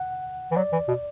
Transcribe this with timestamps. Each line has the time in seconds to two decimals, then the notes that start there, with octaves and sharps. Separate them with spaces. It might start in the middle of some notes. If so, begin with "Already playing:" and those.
Already playing: F#5
0.51 E3
0.56 F#3 D5
0.72 E3
0.88 B2